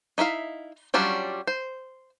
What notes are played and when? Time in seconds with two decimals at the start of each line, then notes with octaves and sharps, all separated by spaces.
0.18 D#4 E4 E5 F5
0.94 F#3 G3 C#4 D4 F4
1.47 C5